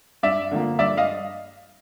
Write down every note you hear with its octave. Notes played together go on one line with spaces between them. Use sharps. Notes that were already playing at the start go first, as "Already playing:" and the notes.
G2 D5 E5
D3 F3 A#3
G2 D5 E5
D#5 F5